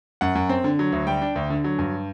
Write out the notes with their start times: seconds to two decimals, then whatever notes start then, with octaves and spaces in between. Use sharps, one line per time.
0.21 F#2 F#5
0.35 F#2
0.49 C4
0.64 D3
0.79 F#3
0.92 D2
1.07 G3 G5
1.22 D4
1.36 D2
1.50 D3
1.64 F#3
1.79 G2